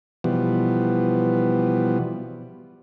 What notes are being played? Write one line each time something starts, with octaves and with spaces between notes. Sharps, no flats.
B2 E3 F3 G3 B3